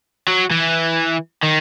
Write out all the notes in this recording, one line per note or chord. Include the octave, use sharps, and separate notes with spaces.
F#3
E3
D#3